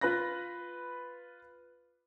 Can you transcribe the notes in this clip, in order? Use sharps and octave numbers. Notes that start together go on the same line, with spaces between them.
F4 B4 B5 F#6 A#6